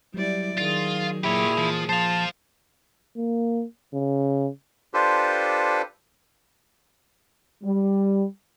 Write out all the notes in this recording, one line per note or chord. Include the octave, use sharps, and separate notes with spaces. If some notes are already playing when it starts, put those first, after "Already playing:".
F#3 G3 E4 D5
D#3 F4 G#4
A#2 E4 G4 G#4 C#5
E3 F3
F3 C5 F5 A5
A#3
C#3
D4 F4 G4 A4 B4 C5
G3